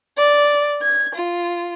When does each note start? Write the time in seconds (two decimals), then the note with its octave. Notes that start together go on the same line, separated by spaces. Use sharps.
0.17 D5
0.81 G#6
1.13 F4